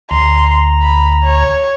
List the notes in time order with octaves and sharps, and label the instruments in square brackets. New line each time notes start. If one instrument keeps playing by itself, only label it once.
[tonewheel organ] D2 A#5 [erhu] C6
[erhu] B5
C#5